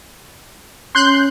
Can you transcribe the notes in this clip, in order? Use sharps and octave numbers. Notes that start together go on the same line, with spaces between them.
C#4 C6 F#6 G6